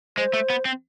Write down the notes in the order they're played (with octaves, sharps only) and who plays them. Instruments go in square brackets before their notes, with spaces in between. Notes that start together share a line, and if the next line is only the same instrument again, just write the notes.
[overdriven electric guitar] G#3 [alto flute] C5
[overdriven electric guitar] A3
B3
C4